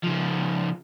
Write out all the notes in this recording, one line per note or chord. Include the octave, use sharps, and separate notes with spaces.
C#3 F3